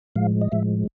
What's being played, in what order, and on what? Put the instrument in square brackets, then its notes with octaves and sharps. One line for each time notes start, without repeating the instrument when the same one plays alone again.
[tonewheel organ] A2 F3 G#3 F5
D#5
A2 F3 G#3 E5